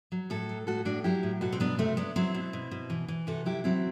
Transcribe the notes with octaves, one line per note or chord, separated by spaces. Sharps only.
F#3
A2 F#4 A4
F#3
A2 F#4 A4
A2 D4 F#4
F#3 E4 G4
A2
B2 F#4 A4
C4
F#3 B3 D4
C3 A3 C4
F#3 B3 D4
F#3 C4 E4
B2
B2
B2
E3
E3
C3 F#4 A4
F#3 E4 G4
F#3 C4 E4